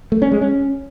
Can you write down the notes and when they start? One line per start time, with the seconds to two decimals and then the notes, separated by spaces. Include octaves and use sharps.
0.12 A3
0.22 C#4
0.32 G#3
0.41 C#4